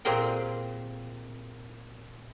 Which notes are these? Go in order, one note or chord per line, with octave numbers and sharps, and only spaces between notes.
A#2 C4 G4 G#4 A#4 G5